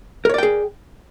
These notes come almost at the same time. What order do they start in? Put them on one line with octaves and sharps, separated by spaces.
A#4 C#5 D5 G5 G#4